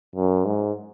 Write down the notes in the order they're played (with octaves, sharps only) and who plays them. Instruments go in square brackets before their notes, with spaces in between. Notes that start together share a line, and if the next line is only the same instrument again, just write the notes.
[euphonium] F#2
G#2